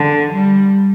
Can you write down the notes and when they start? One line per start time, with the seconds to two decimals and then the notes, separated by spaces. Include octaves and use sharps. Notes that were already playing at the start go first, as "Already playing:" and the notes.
Already playing: D3
0.33 G3